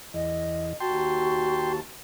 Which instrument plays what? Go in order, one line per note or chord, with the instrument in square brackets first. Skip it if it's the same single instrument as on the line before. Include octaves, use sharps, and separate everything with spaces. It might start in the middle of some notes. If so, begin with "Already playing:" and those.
[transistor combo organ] E2 [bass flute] D#5
[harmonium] D#2 A5 [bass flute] F#4 [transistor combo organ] G5 C6